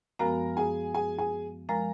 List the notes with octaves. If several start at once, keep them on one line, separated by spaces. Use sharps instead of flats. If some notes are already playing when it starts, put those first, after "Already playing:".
F#2 F3 G#3 B3 F#4 A#4 A#5
G#4 G#5
G#4 G#5
G#4 G#5
F3 G#3 A#4 A#5